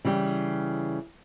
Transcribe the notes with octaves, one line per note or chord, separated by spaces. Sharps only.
C#3 E3 G3 G4